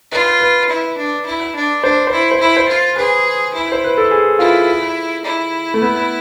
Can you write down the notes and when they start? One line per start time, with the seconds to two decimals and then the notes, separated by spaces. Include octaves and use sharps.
0.11 F4 B4
0.40 B4
0.69 E4
0.97 D4
1.25 E4
1.55 D4
1.84 D4 C5
2.07 E4 C5
2.31 C5
2.40 E4
2.57 C5
2.68 F4
2.97 G#4 B4
3.54 E4
3.72 C5
3.84 B4
3.98 A4
4.11 G#4
4.39 E4 F4
5.24 E4
5.74 A3
5.82 B3